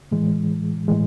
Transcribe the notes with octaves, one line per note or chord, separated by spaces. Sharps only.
A2 E3 G#3
A2 E3 G#3